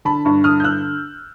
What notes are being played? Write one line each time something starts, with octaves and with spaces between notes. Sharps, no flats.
D3 A5 B5
G2 B5 C#6
D3 D#6 F6
G6
G2 E6 F#6